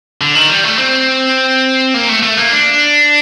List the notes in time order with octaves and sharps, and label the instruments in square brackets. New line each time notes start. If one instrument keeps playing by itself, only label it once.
[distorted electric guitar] D3
D#3
G3
A3
C4
A#3
A3
A3
A#3
D4